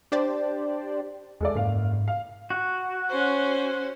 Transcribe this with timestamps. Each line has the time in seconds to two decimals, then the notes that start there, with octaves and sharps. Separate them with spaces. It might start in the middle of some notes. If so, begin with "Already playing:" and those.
0.12 D4 G4 C5 D5
1.40 E2 G#3 A4 D5
1.55 F#1 G#2 F5
2.08 F5
2.50 F#4
3.09 C#4 C5